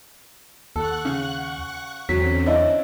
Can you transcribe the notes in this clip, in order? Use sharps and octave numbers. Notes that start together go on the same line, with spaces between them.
D#2 A4 F#5 C#6 F#6
C#3
E2 D3 F#3 C4 C#4 B6
D4 E4 C#5 D#5 F5